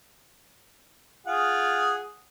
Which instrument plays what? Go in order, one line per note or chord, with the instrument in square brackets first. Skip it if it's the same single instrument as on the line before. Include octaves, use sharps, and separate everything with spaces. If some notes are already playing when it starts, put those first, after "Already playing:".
[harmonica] F4 G#4 F#5